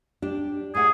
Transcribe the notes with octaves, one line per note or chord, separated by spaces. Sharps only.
D4 G4
A2 G#4 F#5